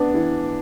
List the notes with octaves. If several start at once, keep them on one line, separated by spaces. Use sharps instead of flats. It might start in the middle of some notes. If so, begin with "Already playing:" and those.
Already playing: B3 D4
E3